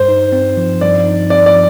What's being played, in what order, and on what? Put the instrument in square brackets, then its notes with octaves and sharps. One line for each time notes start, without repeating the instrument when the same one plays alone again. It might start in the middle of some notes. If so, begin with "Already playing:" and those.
Already playing: [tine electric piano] G2 [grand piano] C5
[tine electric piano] D#4
C4
F3
[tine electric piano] G2 [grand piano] D5
[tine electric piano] D#4
[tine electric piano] C4 [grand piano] D5
[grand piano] D5
[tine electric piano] F3